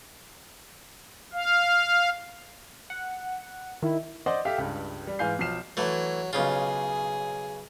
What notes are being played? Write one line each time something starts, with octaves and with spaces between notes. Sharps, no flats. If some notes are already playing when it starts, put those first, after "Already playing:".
F5
F#5
D#3 E4
C5 D5 D#5 F#5 C6
G4 A4 E5 F5
C#2 G2
G3
G#2 E3 F5 G#5 G6 C7
B1 F3 F6 C7 E7
E3 F#3 A3
B1 C#3 F4 G#4